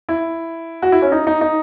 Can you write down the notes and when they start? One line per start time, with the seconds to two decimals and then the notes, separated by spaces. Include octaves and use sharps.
0.09 E4
0.82 F#4
0.92 E4
1.02 C#4
1.12 D#4
1.27 D#4
1.41 D#4